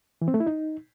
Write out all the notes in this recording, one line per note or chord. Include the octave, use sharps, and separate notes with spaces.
E3
C4
A3
E4
D#4